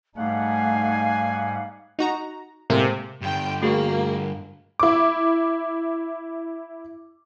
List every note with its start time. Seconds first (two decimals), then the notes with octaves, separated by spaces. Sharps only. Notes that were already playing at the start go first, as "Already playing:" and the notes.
0.17 G#2 G3 A3 D#4 F5 F#5 G#5
1.99 D#4 F#4 A#5
2.70 A2 C3 G#3 A#3
3.22 G2 D3 G5
3.62 A3 A#3 F#4 G#4
4.79 E4 D6